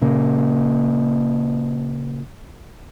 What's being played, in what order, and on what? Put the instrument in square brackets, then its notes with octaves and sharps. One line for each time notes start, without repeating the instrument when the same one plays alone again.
[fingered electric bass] A#2 C#3 A#3